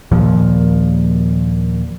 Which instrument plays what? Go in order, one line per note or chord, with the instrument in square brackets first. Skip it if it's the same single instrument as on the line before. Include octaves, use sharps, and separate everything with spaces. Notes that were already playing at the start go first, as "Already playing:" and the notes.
[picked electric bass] D#2 A#2 F3